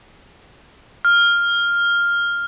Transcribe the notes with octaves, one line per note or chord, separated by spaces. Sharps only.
F6